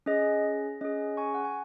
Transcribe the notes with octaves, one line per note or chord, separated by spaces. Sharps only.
C#4 G#4 D#5
C#4 G#4 D#5
G#5 C#6
F#5
G#5